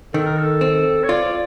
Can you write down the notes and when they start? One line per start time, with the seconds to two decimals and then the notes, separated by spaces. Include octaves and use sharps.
0.14 D#3 A4
0.25 A#4
0.37 A4
0.61 C4
1.03 C#5
1.09 F4 D5